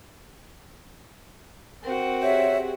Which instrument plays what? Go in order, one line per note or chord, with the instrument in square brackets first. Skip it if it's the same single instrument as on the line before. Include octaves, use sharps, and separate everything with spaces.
[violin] C4 F#4 [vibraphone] A#4
[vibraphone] G4 G#4 [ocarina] C#5 [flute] E5